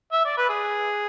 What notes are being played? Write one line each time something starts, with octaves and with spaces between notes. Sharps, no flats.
E5
D5
B4
G#4